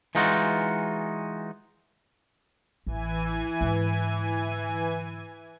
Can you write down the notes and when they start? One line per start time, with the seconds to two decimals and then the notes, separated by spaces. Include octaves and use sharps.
0.15 E3 G#3 D#4 F4 F#4
2.86 A1 E3 G#5
3.61 G#2 D3